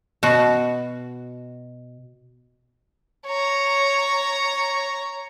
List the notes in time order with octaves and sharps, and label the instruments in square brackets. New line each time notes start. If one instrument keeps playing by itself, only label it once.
[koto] B2 F#4
[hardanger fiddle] C#5 A#5